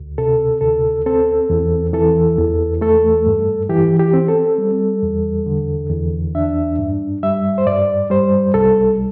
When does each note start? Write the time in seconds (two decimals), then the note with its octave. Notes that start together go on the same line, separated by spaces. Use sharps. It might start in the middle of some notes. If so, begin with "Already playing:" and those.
Already playing: D2
0.18 C3 A4
0.61 D2 A4
1.06 C4 A4
1.50 E2
1.93 E3 A4
2.38 E2
2.81 A3 A4
3.27 G2
3.70 E3 G4
3.99 G4
4.13 C4
4.28 A4
4.58 G3
5.03 E2
5.46 D3
5.90 E2
6.35 D4 E5
6.79 G2
7.23 G3 E5
7.58 C5
7.66 G2 D5
8.10 G3 C5
8.54 C2 A4